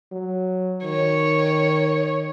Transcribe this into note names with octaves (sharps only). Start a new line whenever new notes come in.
F#3
D#3 C#5